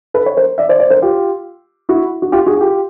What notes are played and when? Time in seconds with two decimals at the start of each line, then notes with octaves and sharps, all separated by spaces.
0.14 A4 B4
0.26 C#5
0.37 A#4 C5
0.58 D5 E5
0.69 C5 D5
0.80 C5 D5
0.90 A#4 C5
1.02 F4 G4
1.89 E4 F#4
2.22 F#4
2.32 F4 G4
2.46 F#4 G#4
2.57 G#4
2.61 F4 G4